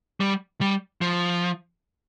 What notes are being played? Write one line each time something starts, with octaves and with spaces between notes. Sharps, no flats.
G3
G3
F3